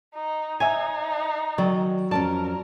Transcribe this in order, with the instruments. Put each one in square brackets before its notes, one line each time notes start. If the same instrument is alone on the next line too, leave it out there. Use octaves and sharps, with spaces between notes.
[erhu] D#4
[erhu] D#4 [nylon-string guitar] C#5 E5 [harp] G#5
[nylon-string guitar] D#3 D5 D#5 [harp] F#3
[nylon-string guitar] F2 C#4 A5 [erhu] A#4 [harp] D5